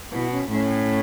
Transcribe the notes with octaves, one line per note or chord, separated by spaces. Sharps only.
B2 E4
C#4
A2 C#4